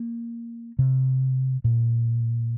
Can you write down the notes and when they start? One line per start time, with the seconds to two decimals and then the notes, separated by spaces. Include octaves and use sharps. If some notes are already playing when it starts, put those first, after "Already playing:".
Already playing: A#3
0.79 C3
1.64 A#2